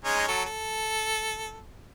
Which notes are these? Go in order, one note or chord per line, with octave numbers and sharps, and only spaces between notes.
G#3 C#4 D#4
F#3 A4
A4